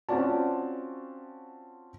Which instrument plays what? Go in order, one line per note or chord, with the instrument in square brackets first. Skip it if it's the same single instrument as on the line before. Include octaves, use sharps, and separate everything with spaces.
[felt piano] C4 C#4 F4 F#4 D5 A5